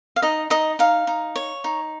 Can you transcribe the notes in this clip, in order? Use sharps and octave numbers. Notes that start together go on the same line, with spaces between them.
F5
D#4 D#5
D#4 D#5
D#4 F5
D#4
C#5
D#4